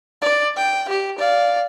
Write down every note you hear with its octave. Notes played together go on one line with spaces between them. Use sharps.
D5
G5
G4
D5 F5